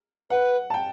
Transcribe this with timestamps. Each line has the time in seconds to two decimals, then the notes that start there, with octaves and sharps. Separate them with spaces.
0.30 B4 F#5
0.70 A5
0.74 G5